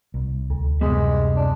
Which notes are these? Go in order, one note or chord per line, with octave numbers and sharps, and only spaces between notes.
C2
D2
F#2 C3 G3 G#3 B3
D4